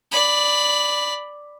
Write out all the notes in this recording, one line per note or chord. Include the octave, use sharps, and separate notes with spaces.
D5 B5